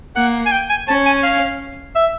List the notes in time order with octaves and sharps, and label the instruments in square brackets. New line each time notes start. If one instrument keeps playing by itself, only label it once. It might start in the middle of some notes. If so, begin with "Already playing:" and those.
[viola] A#3 [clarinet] F#5
[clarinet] G#5
G5
G#5
[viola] C#4 [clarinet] A5
[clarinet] G#5
F5
E5